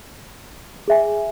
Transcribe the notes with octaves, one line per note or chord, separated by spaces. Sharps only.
G#4 E5 G#5